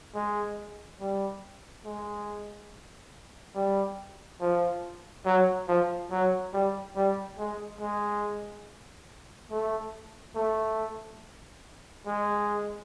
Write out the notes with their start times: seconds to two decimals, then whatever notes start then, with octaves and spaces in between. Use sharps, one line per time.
0.15 G#3
1.01 G3
1.85 G#3
3.56 G3
4.41 F3
5.25 F#3
5.68 F3
6.11 F#3
6.53 G3
6.96 G3
7.39 G#3
7.81 G#3
9.51 A3
10.36 A3
12.07 G#3